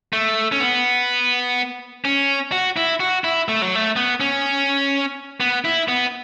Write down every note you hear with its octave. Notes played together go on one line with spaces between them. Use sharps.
A3
C#4
B3
C#4
F#4
E4
F#4
E4
A3
F#3
A3
B3
C#4
B3
E4
B3